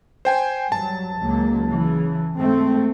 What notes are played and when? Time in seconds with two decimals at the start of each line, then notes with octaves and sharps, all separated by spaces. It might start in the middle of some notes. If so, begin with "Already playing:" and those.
0.25 C5 G5 G#5
0.72 G2 F#3 A5
1.20 C#2 F#3 A#3
1.70 C#3 E3
2.37 G#2 A3 C4